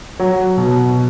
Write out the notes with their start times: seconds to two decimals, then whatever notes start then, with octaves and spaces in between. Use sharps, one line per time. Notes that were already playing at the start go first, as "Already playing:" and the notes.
0.20 F#3
0.57 B2